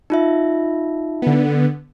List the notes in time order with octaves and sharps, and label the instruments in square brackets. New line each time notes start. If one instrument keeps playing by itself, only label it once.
[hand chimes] D#4 F4 E5
[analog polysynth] D3 B3